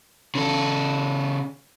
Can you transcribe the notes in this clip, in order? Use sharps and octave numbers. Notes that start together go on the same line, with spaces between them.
C#3 A4